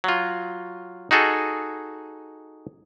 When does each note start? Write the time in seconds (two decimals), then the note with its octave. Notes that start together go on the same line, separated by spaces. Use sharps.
0.04 F#3 F4
1.11 D#4 F#4 G#4 A4